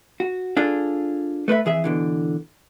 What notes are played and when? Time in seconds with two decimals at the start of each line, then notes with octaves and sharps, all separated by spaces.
0.20 F#4
0.57 D4 F4 G#4 A4
1.48 A3 B4 C5 E5
1.65 F2 E3 G#4 E5
1.84 B2 D3 E3